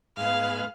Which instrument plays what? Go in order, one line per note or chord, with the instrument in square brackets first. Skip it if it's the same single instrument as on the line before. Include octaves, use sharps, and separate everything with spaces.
[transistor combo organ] G#2 G#3 B3 [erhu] F5